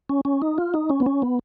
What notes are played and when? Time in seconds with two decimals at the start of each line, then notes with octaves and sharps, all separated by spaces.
0.09 C#4
0.25 C#4
0.42 D#4
0.58 F4
0.74 D#4
0.90 C#4
1.00 B3
1.06 C#4
1.22 B3